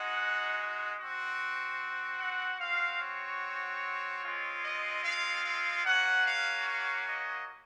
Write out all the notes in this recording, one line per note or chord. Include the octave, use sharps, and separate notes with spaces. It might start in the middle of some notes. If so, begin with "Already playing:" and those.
Already playing: G#3 D#4 F#4 F#5
C4 F#4
F#5
C4 F#4 F5
C#5
G#3 C4 F4
D#5
F5
F5
A#3 C#4 F#4 F#5
F5
F5
D#5